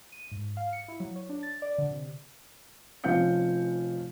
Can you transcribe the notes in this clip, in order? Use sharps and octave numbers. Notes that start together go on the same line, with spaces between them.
D#7
G#2
F5
C#7
E4
F#3
C#5
D4
A6
D5
D3
C3
F1 F3 C#4 F5 G6 C#7